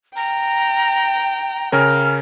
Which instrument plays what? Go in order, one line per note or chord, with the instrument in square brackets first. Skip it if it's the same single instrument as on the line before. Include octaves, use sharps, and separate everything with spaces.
[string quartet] G5 [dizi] A#5
[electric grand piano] C#3 C#4 A#4 [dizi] F6